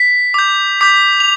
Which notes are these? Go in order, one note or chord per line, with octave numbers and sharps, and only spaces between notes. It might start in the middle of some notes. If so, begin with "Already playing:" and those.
Already playing: B6
D6 G6
D6 G6 B6
F7